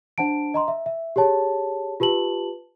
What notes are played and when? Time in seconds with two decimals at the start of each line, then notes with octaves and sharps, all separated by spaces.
0.18 D4 C5 F#5 A5 D7
0.54 D#5 A#5 C6
0.68 E5
0.86 E5
1.16 G4 G#4 C#5 A5
2.00 F4 G4 B4 A5 F#7